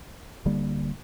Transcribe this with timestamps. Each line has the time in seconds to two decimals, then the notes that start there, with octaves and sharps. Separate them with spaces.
0.45 D1 D3 G3 A#3